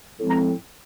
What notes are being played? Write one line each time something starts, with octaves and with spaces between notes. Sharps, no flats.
A2 F3 G#3 C4
A#5